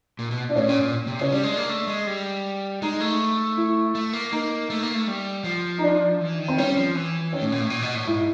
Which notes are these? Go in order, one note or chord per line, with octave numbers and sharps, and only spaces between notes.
A#2
B2
D4
A2 C#4
A#2
A#2
C3
C#3 C#4
G3 D4
G#3
A#3
A3
G#3
G3
G#3 D#4
A3
E4
A3
A#3
A#3 D#4
A3
A#3
A3
G3
F3
D#4
D4
E3
D#3
C4
G3 C#4
F3
E3
D#3 C#4
A2
A#2
A2
A#2
B2
A2
G#2 E4